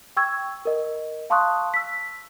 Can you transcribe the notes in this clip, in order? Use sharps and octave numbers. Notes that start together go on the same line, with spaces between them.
G5 C#6 E6 G#6
A#4 D#5
F5 A5 C6 C#6 D#6 F#6
E6 B6